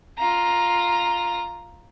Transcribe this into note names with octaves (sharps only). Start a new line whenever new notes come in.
F4 A#5